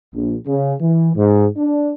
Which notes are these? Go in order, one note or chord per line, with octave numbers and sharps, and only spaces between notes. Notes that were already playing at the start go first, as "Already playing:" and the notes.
A#1
C#3
E3
G#2
D4